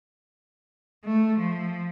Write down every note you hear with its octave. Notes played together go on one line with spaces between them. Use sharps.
A3
F3